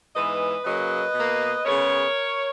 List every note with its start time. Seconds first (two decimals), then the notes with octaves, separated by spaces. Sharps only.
0.14 G#2 E3 G#3 B3 B4 D#5
0.64 C#3 F#3 A#3 B4 D#5
1.15 B2 A#3
1.65 C#3 G#3 B3 A#4 C#5